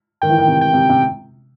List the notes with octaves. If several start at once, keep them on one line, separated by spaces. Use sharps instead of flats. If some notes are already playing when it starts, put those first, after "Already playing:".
D#3 G5
E3
D#3
C3
G5
C3
C3